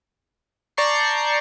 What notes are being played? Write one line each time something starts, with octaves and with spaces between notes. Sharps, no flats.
D5 A5 A#5 C#6 G6 C7